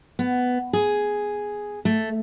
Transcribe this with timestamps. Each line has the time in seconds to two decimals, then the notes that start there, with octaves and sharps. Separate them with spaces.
0.19 B3
0.73 G#4
1.85 A3